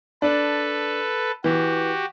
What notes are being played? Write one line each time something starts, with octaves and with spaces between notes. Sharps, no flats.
D4 A4 B4
E3 F#4 G4